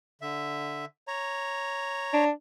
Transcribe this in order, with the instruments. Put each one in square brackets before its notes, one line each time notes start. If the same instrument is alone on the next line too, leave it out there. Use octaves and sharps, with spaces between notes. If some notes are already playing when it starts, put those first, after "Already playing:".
[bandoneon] D3 E5
C#5 A#5
[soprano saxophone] D4